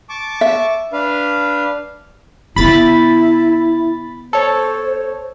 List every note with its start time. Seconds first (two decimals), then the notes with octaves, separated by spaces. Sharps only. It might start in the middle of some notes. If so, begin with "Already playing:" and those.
0.09 A5 C#6 D6
0.41 E5
0.93 D4 B4 F5
2.56 C#3 B3 E4 B5 A6
4.33 A4 C5 C#5